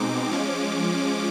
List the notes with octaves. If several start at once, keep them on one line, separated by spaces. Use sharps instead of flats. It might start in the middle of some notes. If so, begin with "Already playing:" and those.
Already playing: B2 G#3 C4 D#4 D6
F3 G#3 C#4